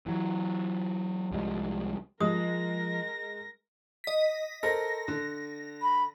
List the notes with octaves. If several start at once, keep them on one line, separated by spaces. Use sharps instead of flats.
E3 F#3
C2 F3 G3 G#3
F3 G#3 A#4 D#6 A#6
D#5 B6
A4 A#4 C5 A#6
D3
B5